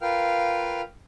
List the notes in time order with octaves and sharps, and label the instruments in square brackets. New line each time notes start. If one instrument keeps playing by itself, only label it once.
[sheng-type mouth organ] F4 A#4 B4 F5 G5 F6